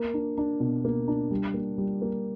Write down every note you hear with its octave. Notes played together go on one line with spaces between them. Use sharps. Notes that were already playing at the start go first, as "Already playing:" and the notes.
Already playing: A#3
D4
D4
B2
A#3
D4
G3
A#3
G3
A#3